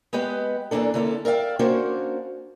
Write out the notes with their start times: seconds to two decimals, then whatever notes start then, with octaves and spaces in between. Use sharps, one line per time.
0.13 G#3 B3 G4 B4 D#5
0.71 E2 E3 A#3 D4 A4
0.94 D3 A#3 C#4 E4 A4
1.25 A#4 D5 E5 F5 G5
1.59 A#3 C#4 D4 F#4 A#4 C5